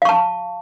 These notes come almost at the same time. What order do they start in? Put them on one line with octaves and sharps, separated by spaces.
F5 C#6 A5